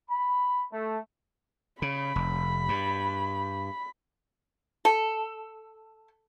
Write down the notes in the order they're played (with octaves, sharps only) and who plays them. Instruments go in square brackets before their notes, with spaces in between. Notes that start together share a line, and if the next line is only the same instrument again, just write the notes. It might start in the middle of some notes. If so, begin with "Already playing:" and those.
[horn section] B5
A3
[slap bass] C#3 [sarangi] B5
[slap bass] F1
G2
[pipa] A4